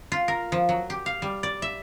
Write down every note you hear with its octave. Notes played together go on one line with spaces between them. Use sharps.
F4
A#4
F3
F#3
G4
F5
G3
D5
E5